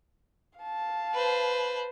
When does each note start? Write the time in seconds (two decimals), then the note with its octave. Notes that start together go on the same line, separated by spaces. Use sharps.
0.59 F5 A5
1.14 B4 C5